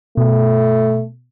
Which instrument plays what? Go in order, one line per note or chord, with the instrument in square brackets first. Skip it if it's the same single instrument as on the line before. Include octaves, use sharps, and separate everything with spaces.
[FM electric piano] B2 [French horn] A3